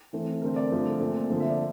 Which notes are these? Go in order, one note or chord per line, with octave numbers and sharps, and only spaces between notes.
E3 A3 C4
D3 A3 C4 A#4
D5
D3 F3 A3
A#2 A3 C4
D3 F3 A#3
E5
D5